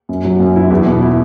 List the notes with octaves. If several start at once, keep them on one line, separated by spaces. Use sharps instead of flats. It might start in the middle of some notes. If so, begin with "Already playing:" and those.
F#2
F#3
F#2
E4
E2
B2
E4